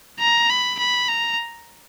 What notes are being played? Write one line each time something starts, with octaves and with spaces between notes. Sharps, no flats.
A#5
B5
B5
A#5